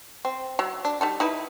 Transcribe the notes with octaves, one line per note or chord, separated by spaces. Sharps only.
C4
F#3
D4
G3 D#4 A4
D#4 E4 B4